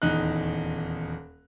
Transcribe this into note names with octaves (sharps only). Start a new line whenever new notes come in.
D#1 E2 D#4 F#6